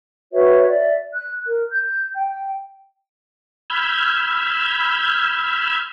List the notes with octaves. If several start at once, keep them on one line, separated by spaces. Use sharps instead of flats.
F#4 B4 C#5 E5
D5 E5
F#6
A#4
G6
G5
B5 E6 F6 G6 G#6